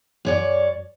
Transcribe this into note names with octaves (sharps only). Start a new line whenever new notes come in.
F#2 C#5 D5